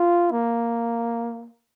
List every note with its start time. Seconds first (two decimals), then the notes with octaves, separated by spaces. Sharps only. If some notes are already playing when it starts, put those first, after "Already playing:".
Already playing: F4
0.32 A#3